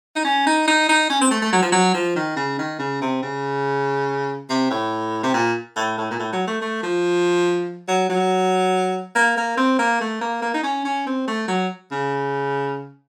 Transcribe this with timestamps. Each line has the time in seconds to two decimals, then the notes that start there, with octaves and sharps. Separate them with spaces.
0.16 D#4
0.25 C#4
0.47 D#4
0.68 D#4
0.89 D#4
1.10 C#4
1.21 C4
1.31 A3
1.42 A3
1.53 F#3
1.62 F3
1.72 F#3
1.94 F3
2.16 D#3
2.37 C#3
2.59 D#3
2.79 C#3
3.01 C3
3.22 C#3
4.50 C3
4.70 A2
5.23 C3
5.34 A#2
5.76 A2
5.98 A2
6.11 A#2
6.19 A2
6.33 F#3
6.47 A3
6.61 A3
6.83 F3
7.88 F#3
8.09 F#3
9.15 A#3
9.37 A#3
9.57 C4
9.79 A#3
10.01 A3
10.21 A#3
10.42 A#3
10.54 D#4
10.63 C#4
10.85 C#4
11.07 C4
11.28 A3
11.48 F#3
11.91 C#3